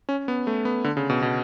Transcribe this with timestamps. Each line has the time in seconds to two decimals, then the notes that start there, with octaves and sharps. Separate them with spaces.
0.09 C#4
0.28 B3
0.47 A3
0.65 B3
0.84 D3
0.97 C#3
1.10 B2
1.22 B2